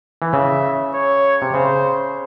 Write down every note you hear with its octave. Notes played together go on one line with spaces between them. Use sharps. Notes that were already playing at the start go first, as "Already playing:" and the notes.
E3
C#3 E5
C#5
C3
C#3 C5